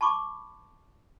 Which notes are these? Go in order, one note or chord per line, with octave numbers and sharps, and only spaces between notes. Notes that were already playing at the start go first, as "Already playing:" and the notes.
A5 B5 C#6 D6